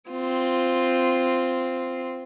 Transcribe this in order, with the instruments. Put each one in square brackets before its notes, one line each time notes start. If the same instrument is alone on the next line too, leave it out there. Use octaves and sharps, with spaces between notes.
[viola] C4 F4